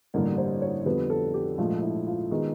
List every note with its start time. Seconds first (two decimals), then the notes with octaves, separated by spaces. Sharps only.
0.14 A1 G2 D3 G3 A#3 A#4
0.37 C5
0.62 C#5
0.86 F2 D3 G3 B3 B4
1.10 A4
1.34 G4
1.58 A#1 G#2 F3 A3 F4
1.82 E4
2.07 F4
2.31 D#3 G#3 B3